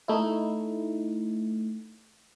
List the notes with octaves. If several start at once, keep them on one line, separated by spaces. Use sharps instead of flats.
A3 D#4 E4